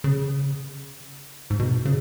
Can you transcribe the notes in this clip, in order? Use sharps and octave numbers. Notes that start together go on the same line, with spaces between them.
C#3
G#2
B2
C#3